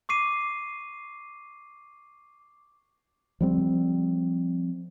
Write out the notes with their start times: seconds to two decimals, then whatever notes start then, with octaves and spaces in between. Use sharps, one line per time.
0.09 C#6 D6 C7 D#7
3.41 F3 G3 C4